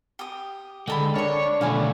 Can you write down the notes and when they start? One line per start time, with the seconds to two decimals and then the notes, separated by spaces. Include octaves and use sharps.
0.19 G4 D#6
0.88 D3 G#3 G5 A5 B5
1.16 D4 A#4 C#5 C#6
1.61 B1 D3 A3 F5 G#5 B5